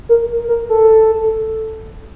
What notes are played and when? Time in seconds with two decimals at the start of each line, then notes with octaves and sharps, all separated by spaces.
0.09 A#4
0.48 A#4
0.69 A4